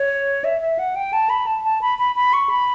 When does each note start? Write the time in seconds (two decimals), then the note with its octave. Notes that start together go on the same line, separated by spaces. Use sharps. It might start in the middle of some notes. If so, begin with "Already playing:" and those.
Already playing: C#5
0.44 E5
0.61 E5
0.79 F#5
0.96 G5
1.13 A5
1.30 B5
1.47 A5
1.64 A5
1.82 B5
1.99 B5
2.16 B5
2.33 C#6
2.49 B5